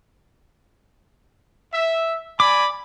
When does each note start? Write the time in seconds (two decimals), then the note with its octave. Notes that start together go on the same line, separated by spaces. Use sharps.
1.73 E5
2.40 D5 G#5 B5 D6